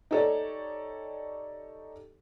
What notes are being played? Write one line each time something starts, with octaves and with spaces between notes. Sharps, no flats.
D#4 G4 A4 C#5 D5